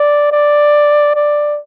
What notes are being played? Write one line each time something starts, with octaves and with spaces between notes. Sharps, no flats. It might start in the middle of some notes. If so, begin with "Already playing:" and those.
Already playing: D5
D5
D5